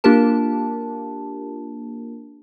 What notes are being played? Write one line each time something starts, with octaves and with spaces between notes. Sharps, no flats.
A#3 D4 F4 G4 A#4 A5